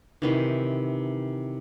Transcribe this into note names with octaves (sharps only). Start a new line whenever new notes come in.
C3 D#3 E3